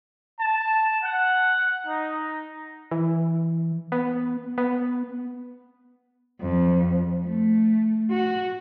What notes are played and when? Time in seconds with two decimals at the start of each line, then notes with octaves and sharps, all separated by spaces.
0.38 A5
1.02 F#5
1.86 D#4
2.91 E3
3.92 B3
4.58 B3
6.41 F2
7.25 A3
8.10 F#4